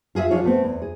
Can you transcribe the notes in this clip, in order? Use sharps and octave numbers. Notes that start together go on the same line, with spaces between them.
F4 G#4 D5 E5
F3 D4 F4 G#4 C#5
A3 B3 C4
E2
G#4